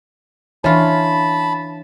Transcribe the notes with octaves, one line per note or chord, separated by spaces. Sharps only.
E3 D4 F4 C#5 A5 B5